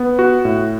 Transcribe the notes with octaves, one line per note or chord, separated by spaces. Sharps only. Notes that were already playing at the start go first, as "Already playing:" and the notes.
Already playing: B3
F#4
A2